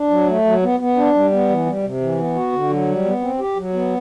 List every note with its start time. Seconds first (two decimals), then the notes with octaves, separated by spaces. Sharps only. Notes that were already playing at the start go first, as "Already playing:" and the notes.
Already playing: D4
0.10 F#3
0.27 A3
0.45 F#3
0.63 B3
0.80 B3
0.96 D4
1.15 G3
1.32 B3
1.49 E3
1.66 G3
1.83 C3
2.01 E3
2.19 B3
2.36 F#4
2.52 D3
2.69 F#3
2.88 G3
3.05 B3
3.21 C4
3.39 G4
3.57 F#3
3.73 B3